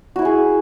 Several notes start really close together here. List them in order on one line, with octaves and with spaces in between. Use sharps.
F#4 E4 E5 G#4